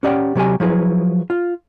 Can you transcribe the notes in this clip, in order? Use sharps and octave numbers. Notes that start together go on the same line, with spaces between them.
C#4 G4 D5 D#5 F#5 G5
C3 F#3 G4 G#5
F3 F#3 E4 G#4 B4
F4